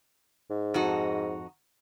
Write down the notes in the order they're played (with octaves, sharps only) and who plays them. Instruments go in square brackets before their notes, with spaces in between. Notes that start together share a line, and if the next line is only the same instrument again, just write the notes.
[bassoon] G#2
[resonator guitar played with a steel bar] F2 D#4 F#4